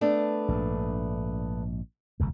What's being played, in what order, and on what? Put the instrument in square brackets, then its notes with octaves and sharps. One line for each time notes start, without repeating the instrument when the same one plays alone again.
[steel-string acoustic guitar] A3 B3 D4
[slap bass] A#1 G#2
E1 C#2 F#2